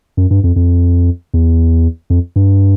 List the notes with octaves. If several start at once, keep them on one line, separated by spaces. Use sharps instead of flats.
F#2
G2
F2
F2
E2
F2
G2